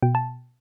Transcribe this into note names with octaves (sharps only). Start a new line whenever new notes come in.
B2 G5
A5